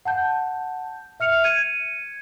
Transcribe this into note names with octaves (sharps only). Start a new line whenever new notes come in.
F#5 A5 G6
E5 F6 C#7 F7
G#6 C#7 D#7